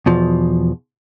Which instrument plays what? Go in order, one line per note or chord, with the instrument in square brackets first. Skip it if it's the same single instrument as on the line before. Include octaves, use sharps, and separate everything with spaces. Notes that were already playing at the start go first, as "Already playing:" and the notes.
[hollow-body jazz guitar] E2 B2 F3